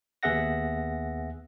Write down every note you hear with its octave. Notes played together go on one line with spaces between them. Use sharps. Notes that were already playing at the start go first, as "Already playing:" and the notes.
D#2 B3 G#4 E5 F#5 A#6